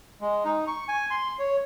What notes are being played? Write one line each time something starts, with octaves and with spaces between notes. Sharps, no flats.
G#3
D#4
C#6
G#5
C6
C#5